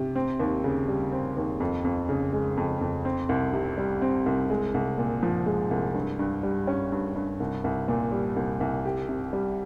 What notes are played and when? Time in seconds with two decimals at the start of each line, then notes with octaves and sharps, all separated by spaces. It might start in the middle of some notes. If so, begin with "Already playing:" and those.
Already playing: C3
0.15 C4
0.40 D#2
0.64 C#3
0.88 G3
1.12 C4
1.37 D#2
1.60 F2
1.85 F2
2.09 C#3
2.33 G#3
2.57 F2
2.81 F2
3.05 C4
3.29 C2
3.53 C3
3.78 G3
4.02 C4
4.26 C2
4.50 G#3
4.74 C2
4.98 A#2
5.23 F3
5.46 G#3
5.71 C2
5.94 G2
6.19 G2
6.43 G3
6.67 C#4
6.92 G2
7.16 G2
7.40 C2
7.64 C2
7.88 A#2
8.12 G3
8.36 C2
8.60 C2
8.85 G4
9.09 C3
9.33 G3